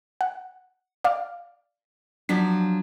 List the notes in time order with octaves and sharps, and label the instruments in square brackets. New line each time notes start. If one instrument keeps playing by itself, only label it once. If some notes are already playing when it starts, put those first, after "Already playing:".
[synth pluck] F#5
D5 F5
[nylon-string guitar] F3 F#3 D4 [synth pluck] B6